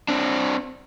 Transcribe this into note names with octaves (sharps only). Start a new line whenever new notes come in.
C4 D4